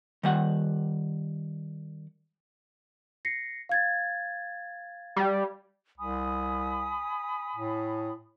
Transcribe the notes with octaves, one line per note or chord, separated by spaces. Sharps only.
D#3 G3 F#5
A#6 C7 C#7
F5 G#6 A6
G3
C2 G#5 B5 D#6
A2